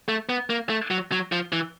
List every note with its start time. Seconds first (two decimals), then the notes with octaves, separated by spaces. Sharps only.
0.08 A3
0.29 B3
0.50 A#3
0.70 A3
0.91 F#3
1.12 F#3
1.32 F3
1.52 E3